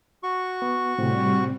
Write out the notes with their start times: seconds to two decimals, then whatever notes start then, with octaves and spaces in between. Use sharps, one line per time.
0.23 F#4 C#6
0.62 B3
0.98 A2 C3 G3 C4